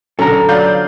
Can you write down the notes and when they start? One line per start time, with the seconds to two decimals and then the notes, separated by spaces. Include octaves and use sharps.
0.19 B2 D3 F#3 C#4 A4 A#5
0.49 F#3 B3 F4 D5 F5 G6